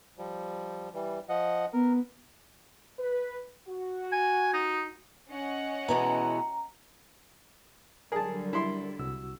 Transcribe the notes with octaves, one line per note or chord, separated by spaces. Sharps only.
F3 G3
E3 G3
F3 D#5 F#5
B3 A#4
B4
F#4
G#5
D#4
C#4 D#5 F#5
B2 E3 G#3 A#5
D3 F#3 G3 G#4 A#4 A5
E4 C6
C2 F#4 E6